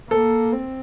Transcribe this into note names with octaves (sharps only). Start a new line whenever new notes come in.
A#3 A4
C4